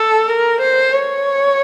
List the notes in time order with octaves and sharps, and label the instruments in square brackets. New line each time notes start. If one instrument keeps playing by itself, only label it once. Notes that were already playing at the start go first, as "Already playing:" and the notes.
Already playing: [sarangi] A4
A#4
C5
C#5